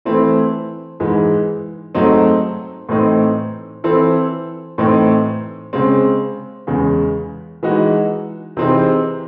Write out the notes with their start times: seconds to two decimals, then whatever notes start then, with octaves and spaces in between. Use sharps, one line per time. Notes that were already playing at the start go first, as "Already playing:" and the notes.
0.05 E3 A3 C4 E4
1.00 G#2 E3 G#3
1.95 G#2 F#3 A3 C4 D#4
2.89 A2 E3 C4 D#4
3.84 E3 C4 E4 A4
4.78 A2 E3 C4 D#4
5.73 C#3 G#3 C4
6.67 E2 C#3 G#3
7.63 E3 G#3 D#4 F#4
8.57 C3 E3 C4 D#4 G#4